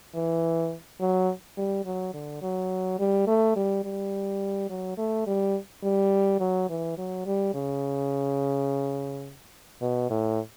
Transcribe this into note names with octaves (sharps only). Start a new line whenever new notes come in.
E3
F#3
G3
F#3
D3
F#3
G3
A3
G3
G3
F#3
A3
G3
G3
F#3
E3
F#3
G3
C#3
B2
A2